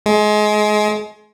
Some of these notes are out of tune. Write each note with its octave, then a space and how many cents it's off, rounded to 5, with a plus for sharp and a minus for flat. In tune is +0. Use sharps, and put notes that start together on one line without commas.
G#3 +25